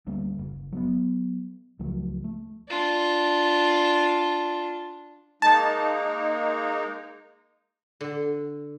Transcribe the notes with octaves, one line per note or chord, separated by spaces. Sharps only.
D2 G3 A#3 C#4
F#1
F#3 A#3 B3
C#2 F3 F#3 A3
A3
D4 F4
G#3 A#3 D#4 A5
D3